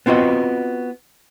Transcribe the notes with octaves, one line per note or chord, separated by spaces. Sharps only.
B3 C4 F4 F#4 D#5